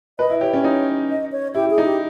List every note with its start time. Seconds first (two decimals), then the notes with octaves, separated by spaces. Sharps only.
0.19 B4 D#5
0.30 E4
0.41 G4 C#5
0.53 C#4
0.64 D#4
1.09 D#5
1.32 C#5
1.54 E4 G4
1.70 G#4
1.78 D#4
1.85 G4